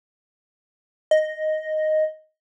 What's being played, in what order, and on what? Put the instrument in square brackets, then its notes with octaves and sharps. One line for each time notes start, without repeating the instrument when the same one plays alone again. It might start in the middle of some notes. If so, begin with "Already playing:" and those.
[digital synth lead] D#5